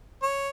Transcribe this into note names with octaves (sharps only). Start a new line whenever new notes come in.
C#5